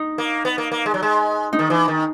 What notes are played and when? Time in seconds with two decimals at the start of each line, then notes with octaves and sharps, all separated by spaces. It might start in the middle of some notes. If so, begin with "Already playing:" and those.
Already playing: D#4
0.18 A#3
0.45 B3
0.58 A#3
0.71 A#3
0.86 G#3
0.94 F#3
1.03 G#3
1.53 D#4
1.59 D#3
1.70 E3
1.88 D#3